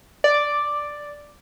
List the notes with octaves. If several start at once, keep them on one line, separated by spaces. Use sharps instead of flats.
D5